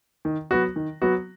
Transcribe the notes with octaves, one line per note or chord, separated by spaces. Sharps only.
D#3
F#3 B3 F#4
D#3
F#3 B3 F#4